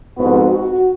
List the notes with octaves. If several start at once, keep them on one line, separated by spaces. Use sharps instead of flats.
F2 G#2 B3 F#4
F#4